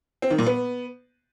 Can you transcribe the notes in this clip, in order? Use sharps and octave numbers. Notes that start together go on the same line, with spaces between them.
C4
D#3
A#2
B3